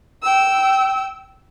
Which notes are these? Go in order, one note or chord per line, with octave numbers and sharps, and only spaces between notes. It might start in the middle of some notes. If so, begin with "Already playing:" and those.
G5 E6